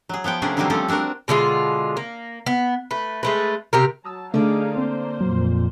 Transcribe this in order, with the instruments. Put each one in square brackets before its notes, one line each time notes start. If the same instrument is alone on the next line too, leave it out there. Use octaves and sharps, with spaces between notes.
[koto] F#3 G#4
F3 B3 F#5 G5
C3 A3 A#3 C#4 D4 G#4
D3 D#3 F#3 G3 A#3 C4
F3 G3 A3 C4 C#4 A4
C4 D4 F#4 A#4 F#5
[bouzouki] B2 D3 G#3 F4
A#3
B3
A3 B4
G#3 A3 B4
C3 G4 A#4
[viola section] F#3 A5 [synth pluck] A#5 D#6 E6
[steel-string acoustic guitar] D3 D5 [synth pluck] A3 [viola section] D#4 G#4 F5
[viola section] A#3 C5 [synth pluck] C4
[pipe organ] F2 A#2 [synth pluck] F#3